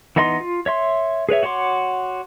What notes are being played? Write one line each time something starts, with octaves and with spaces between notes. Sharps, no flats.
E3 B3 D#4 D#5 C6
F4
C#5 E5 C6
G#4 B4 C#5 E5
F#4 C#5 F#5 C6 D6